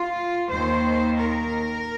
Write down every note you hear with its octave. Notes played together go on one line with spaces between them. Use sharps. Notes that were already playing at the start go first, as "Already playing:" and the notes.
Already playing: F4
D#2 D#3 C5
A#4